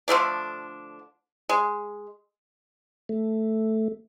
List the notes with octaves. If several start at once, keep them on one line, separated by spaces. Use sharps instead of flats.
D3 F3 A3 D4
G#3
A3